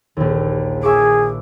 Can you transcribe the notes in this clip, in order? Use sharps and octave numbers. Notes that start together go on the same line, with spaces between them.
A#1 D#2
G#4 E5 C#6 D6